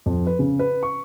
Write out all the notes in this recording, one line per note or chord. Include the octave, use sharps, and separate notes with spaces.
F2
B4
C#3
B4
C#6